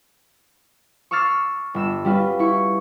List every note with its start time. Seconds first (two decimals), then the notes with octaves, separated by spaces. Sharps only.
1.11 C#6 D6 E6 F6 A6 C7
1.74 G1 E6 E7
2.05 G3 C#4 F4 F#4 B4
2.39 E4 C#6